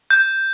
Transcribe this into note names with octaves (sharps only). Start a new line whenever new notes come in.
G6